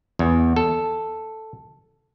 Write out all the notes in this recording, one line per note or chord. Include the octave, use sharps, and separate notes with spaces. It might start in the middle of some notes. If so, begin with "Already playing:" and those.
E2
A4